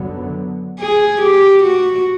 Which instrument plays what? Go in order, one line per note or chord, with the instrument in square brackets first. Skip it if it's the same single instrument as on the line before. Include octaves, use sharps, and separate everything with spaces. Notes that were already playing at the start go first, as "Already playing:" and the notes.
Already playing: [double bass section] F#2 D3 F#3 B3
[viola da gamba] G#4
G4
F#4